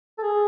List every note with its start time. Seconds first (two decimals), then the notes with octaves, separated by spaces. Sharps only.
0.18 A4
0.23 G#4